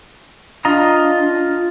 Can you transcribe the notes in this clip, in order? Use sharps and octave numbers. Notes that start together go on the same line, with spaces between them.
D4 F4 D#5 A#5